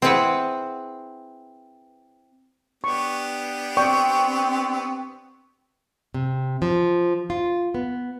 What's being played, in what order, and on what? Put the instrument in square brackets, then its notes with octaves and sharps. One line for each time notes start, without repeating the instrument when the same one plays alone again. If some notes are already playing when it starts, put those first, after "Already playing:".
[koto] C4 E4 G#4 B4 F#5
[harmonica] B3 D4 G4 [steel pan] C#6
[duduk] C4 [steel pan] D5 G5 [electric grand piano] C#6
[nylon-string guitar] C3
F3
F4
B3